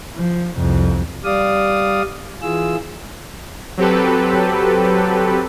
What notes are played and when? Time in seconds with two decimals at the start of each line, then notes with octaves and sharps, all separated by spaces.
0.16 F3
0.57 C2 F2
1.24 G3 D5 F5 D#6
2.42 E3 F4 G#4 E6
3.77 F#3 C4 G4 A4 B4